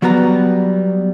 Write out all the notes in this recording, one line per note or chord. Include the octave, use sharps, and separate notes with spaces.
F#3 G3 B3 B4 A#5